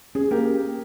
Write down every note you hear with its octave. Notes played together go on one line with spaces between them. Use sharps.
C#4 G#4
A#3 G4 A#4